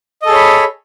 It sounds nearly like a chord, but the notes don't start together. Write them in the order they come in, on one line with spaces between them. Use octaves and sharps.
D#5 A4 G#4 C#5 B5